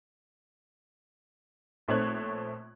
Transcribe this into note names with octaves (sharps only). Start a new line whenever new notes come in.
A#1 A3 C4 C#5 F#6 G#6